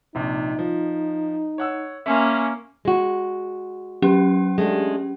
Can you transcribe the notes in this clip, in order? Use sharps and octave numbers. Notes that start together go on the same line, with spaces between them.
A#1 C3 D#4
F3
C#5 F#5 E6
A#3 C#4 E5 G#5 C6
G#3 F#4
F#3 C#4 G4
G#3 A3 D4